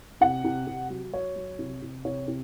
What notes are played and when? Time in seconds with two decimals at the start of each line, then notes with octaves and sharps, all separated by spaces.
0.21 C3 F#5
0.44 C3
0.67 C3
0.90 F#3
1.13 F#3 C#5
1.36 F#3
1.59 C3
1.82 C3
2.05 C3 C#5
2.28 C3